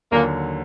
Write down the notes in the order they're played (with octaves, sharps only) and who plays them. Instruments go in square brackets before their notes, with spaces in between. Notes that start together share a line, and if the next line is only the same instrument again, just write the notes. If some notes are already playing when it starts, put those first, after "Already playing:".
[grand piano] D#2 D3 F#3 [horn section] A#2 A#3